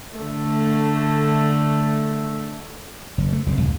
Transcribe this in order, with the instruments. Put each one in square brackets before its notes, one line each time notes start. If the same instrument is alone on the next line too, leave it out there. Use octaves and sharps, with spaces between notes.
[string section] D3 A3
[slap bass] F#1
A3
F#1 C2 F2 G#2
D2 A#2 D3 G#3